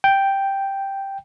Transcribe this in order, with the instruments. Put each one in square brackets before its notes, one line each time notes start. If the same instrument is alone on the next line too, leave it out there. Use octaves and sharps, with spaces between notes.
[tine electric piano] G5